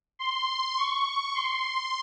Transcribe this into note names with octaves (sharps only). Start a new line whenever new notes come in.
C6
C#6
C6